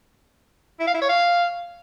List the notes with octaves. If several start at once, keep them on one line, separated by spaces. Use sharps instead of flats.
E4
F5
E4
C#5
F5